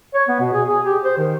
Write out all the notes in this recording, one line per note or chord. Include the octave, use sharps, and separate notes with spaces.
C#5
B3
B2
G#4
G#4
G4
C5
D#3